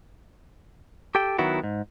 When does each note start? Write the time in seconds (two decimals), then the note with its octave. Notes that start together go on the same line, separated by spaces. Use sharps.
1.15 G4 A4 G5
1.38 D#3 F#3 B3 E4 F#4
1.63 G#2